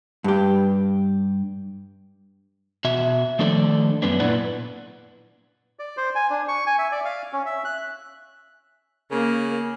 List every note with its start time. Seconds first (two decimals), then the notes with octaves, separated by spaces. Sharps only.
0.24 G2 G4
2.85 B2 F#4 E5
3.39 D#3 F3 A3 D4 A4 D5
4.02 F#2 B3 D4
4.20 A#2 E4 B4 D5 F#5
5.79 D5
5.97 C5
6.15 G#5
6.30 D4
6.48 C#6
6.66 G#5
6.79 E5
6.92 D5
7.05 F5
7.33 C#4
7.46 E5
7.65 F#6
9.11 C#3 A#3